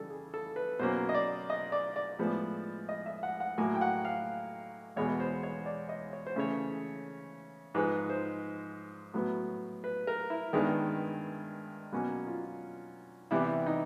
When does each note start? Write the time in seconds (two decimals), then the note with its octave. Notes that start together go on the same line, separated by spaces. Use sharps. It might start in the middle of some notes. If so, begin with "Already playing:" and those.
Already playing: C#3 E3 G3 A4
0.10 G#4
0.34 A4
0.56 B4
0.79 B2 F#3 A#3 C#4 C5
1.09 D#5
1.15 D5
1.50 D#5
1.72 D5
1.96 D5
2.19 A2 F3 G#3 B3
2.89 D#5
3.06 E5
3.23 F#5
3.40 F#5
3.58 A2 F#3 A#3 G#5
3.75 G5
3.81 F#5
4.05 F5
4.96 E2 B2 G#3 C#5
5.20 C5
5.43 C#5
5.66 D5
5.89 D#5
6.13 C#5
6.27 C5
6.36 C#3 E3 A3 C#4 C#5
7.74 G#2 F3 G#3 B4
8.10 C5
9.14 A2 F#3 B3
9.84 B4
10.07 A#4
10.30 E4
10.53 G2 D#3 G#3 B3
11.93 B2 F#3 A#3 C#4
12.27 F4
13.31 C3 E3 G3 B3 E4
13.66 D#4